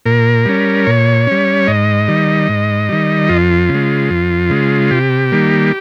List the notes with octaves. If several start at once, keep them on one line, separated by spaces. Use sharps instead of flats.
A#2 A#4
G3 C#4
A#2 C#5
G3 C#4
G#2 D#5
D#3 G3
G#2
D#3 G3
F2 F4
C#3
G#3
F2
C#3 G#3
C3 G4
D#3 G3 A#3